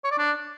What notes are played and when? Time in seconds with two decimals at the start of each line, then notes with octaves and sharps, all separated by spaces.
0.04 C#5
0.11 D5
0.18 D4